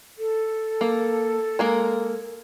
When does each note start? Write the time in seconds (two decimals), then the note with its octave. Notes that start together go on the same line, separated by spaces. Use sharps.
0.18 A4
0.81 A#3
1.59 G#3 A#3 A#4